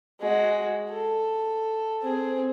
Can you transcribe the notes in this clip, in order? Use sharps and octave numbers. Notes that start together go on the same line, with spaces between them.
G#3 F#4
A4
C4 G#4